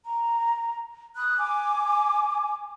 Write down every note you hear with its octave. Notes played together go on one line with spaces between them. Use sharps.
A#5
B5 D#6 F#6
G#5 D6